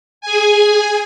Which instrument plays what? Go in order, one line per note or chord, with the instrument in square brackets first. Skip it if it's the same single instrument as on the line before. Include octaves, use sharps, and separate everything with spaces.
[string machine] G#4 G#5